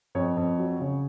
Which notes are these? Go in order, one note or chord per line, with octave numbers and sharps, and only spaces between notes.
F2 C#5
F2
F#3
C#3